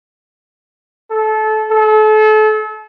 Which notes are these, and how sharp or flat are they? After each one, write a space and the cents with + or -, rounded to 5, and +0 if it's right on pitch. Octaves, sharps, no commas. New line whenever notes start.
A4 -25
A4 -35